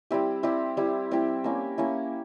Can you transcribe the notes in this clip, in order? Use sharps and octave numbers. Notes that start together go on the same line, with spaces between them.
G3 C4 E4 G4
G3 C4 E4 G4
G3 C4 E4 G4
G3 C4 E4 G4
A#3 C#4 E4
A#3 C#4 E4